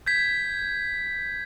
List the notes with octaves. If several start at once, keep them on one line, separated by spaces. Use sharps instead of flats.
G6 G#6 B6